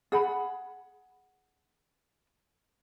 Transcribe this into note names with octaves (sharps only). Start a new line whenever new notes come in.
G#4 F#5 B5